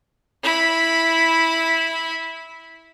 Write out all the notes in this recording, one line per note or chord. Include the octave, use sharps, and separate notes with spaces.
E4 B5